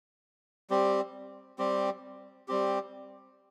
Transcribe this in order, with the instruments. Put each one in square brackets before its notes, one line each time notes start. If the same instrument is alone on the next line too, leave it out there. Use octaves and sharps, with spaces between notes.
[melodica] G3 C4 G4
G3 C4 G4
G3 C4 G4